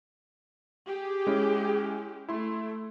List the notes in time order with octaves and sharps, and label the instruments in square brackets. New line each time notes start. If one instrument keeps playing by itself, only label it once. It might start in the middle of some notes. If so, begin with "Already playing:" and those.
[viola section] G4 G#4
[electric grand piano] G#3 C#4 E4
[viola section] A3 [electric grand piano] E4 C6